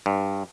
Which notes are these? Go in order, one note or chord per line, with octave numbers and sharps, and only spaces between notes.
G2